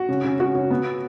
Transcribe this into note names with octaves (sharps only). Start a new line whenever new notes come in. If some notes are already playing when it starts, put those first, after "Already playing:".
Already playing: F#4
C#3
C#3
C#3 F#4
C#3
B3